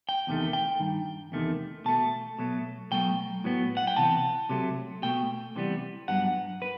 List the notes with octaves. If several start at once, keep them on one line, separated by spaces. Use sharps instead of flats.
G5
E2 C3 D#3 A3
G5
G2 D#3
E2 C3 D#3 A3
B2 A3 A5
B2 F#3 A3
B2 F#3 A3 G5
A2 F#3 B3
F#5
G5
C3 E3 B3 A5
C3 F#3 A3
B2 A3 G5
C3 E3 G3 B3
G2 F#3 B3 F#5
B4